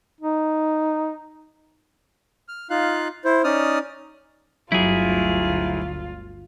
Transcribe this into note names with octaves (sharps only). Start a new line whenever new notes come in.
D#4
F6
D#4 F4 F5 F#6
E4 C5
C#4 D#4 D5 D#6 F6
G1 D2 F#3 E4 F4 G#4